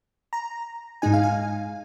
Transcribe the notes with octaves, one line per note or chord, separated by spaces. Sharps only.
A#5
G#2 G#3 D#4 G#5
F5
G#5